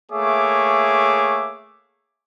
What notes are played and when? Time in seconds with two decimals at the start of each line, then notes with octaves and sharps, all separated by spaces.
0.11 A3 A#3 G#4 C#5 E5 D6